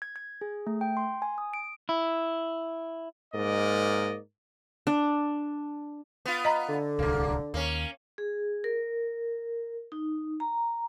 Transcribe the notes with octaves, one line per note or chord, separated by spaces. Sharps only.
G#6
G#6
G#4
A3
G5
C6
G#5
D#6
D7
E4
G#2 A#3 A#4 D5 D#5
D4
B3 F4
D#5 A#5
D3
D1 C2 G2 A#3
D#2 A#3 C#4
G#4
A#4
D#4
A#5